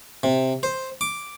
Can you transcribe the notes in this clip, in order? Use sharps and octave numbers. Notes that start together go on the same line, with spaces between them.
C3
C5
D6